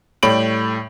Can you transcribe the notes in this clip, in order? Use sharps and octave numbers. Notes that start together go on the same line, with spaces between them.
A2 G3 C#5 B5 D7 F#7